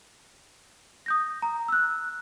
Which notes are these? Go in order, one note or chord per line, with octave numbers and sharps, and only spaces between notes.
D#6 G6 A#6
A#5
E6 F#6